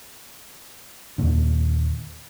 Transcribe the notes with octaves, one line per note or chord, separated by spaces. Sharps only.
D#2 A#2 D3